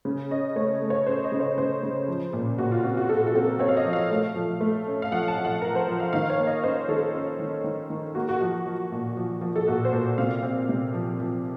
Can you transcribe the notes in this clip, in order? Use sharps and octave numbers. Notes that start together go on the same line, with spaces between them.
C#3
C#4 D#5
A3 C#5
A3
C#5
C#4 C5
D#5
C#3
C#5
C#3 C5
C#3
F3
A#2
A#2 F#4
F4
C4 F#4
F#4
A#2 A4
A4
C4
A#4
C4 C#5
F5
D#5
F3
F5
A3
F3
A3
C#4
F5
F3 F#5
A5
F3
F#5
F3 A#4
C5
F3
F5
D#3 F5
C#5
A#3
D#5
C#4 C5
D#3 A4
C#4
D#3
D#3
D#3
A#3 F#4
F#4
F3 F#4
F3
A#2
F3
F3
A4
A#2 F#4
C5
A#2
C3 F5
C4
C3
F3
F3